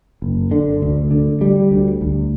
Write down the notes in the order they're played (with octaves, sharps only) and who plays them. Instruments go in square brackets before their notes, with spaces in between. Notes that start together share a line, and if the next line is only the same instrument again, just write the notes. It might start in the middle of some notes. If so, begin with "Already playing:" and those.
[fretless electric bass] F#1
D3
D2
D3
G3
D2
D2